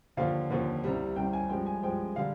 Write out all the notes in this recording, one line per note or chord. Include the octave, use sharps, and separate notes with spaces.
D#2 D3 F3 F5
D#2 D3 F3
C2 C3 G3
C2 C3 G3 G5
G#5
G2 F3 G#3 G5
G#5
G2 F3 G#3 G5
D3 G3 F5